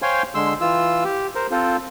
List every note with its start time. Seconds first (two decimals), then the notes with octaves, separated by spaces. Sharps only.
0.02 C5 C#5 F5 G5 G#5 C6
0.35 D3 G#3 C6 E6
0.61 E3 F4 E6
1.05 G4
1.35 A#4 C5
1.51 C4 F4 A4 C5